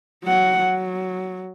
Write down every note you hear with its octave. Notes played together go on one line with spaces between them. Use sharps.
F#3 F#5
F#3